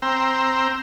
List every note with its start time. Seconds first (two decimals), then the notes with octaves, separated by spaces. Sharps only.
0.02 C4 G5 A#5 C6 E6